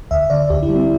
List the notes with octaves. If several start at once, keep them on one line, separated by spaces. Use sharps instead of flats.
D2 E5
D3 D5
D2 G4
E4
G3
C4